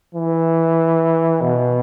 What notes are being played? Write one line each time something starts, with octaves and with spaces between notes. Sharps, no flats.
E3
B2